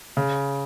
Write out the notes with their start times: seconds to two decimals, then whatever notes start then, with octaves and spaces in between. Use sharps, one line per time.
0.17 C#3